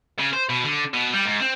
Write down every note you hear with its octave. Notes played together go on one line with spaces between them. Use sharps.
C#3
C5
B2
D3
B2
G3
G#2
C4